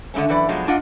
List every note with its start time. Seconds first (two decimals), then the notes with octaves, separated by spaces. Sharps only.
0.14 D3 F3 G#3 A3 C#4
0.29 F#2 E3 B4 D5
0.49 B2 F3 F#3 G#3
0.67 G#2 D4 F4 D#5 F#5